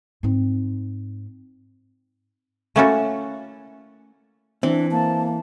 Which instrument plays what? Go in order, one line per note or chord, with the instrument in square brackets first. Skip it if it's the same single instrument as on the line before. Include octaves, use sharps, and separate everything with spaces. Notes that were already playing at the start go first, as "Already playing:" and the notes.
[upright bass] G#2 C4
[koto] A3 A#3 C#4 E4 F#4 A4
[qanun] E3 [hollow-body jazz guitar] C4 [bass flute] D4
[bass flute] A#3 [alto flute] A5